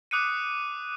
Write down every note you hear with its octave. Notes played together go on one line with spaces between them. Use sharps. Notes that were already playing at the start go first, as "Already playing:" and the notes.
D6 D#6 F#6 C#7 D#7